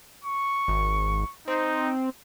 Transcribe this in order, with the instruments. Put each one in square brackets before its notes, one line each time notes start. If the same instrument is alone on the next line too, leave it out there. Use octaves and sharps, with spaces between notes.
[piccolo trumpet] C#6
[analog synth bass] G#1
[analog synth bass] C4 [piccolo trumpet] D#4